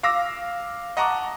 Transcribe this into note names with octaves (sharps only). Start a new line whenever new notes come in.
F5 D6 E6 A#6
D#5 F#5 A5 A#5 C#6 D6